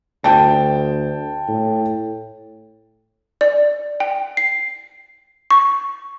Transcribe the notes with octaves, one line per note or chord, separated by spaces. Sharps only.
D2 G5 A5
A2
D5
G5
C7
C#6